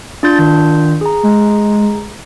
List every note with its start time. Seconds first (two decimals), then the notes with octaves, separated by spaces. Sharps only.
0.23 D4 F4 G6 A6
0.39 D#3
1.01 G#4 A#5
1.23 G#3